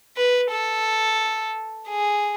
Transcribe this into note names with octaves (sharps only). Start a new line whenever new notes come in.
B4
A4
G#4